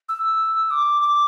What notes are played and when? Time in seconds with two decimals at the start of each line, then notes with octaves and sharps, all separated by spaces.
0.09 E6
0.71 D6
1.02 D6